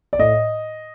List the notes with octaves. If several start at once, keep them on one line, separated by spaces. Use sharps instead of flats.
D5
A2 D#5